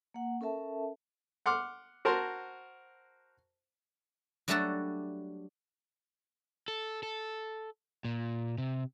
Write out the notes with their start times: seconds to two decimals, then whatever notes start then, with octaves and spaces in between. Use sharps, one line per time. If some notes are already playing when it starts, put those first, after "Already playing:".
0.14 A#3 F#5
0.41 C#4 A4 A#4 E5 A5
1.46 F#5 C6 D6 F6
2.05 F#4 A#4 C5 A5 C6
4.48 F#3 G3 A3 D4 F#4 A4
6.68 A4
7.03 A4
8.05 A#2
8.58 C3